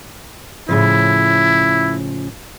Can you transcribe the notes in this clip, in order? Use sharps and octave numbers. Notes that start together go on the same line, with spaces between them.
A2 C#3 F3 E4